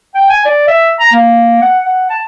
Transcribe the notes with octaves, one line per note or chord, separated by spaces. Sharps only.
G5
G#5
D5
E5
A#5
A#3
F#5
F#5
A5